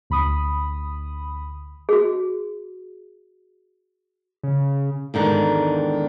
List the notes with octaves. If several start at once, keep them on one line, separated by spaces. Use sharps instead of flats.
D2 B5 D#6
F#4 G#4
C#3
E2 G#2 D3 D#3